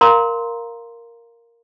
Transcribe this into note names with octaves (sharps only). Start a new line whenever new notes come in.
A#4 F5 A#5 C6